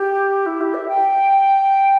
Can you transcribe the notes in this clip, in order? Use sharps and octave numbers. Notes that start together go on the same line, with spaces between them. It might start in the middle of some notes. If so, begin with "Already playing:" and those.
Already playing: G4
E4
G4
E5
G5